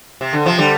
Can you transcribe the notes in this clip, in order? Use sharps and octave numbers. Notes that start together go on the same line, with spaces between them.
C3
D3
C3 F3
D3 G3